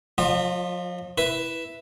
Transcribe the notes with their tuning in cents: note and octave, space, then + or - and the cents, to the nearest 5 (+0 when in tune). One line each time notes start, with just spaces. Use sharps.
F3 +45 F4 +10 D#5 -35
E4 +0 B4 +0